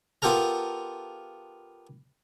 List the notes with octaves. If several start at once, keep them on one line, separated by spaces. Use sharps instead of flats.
B3 F4 G4 A4 A#4 A#5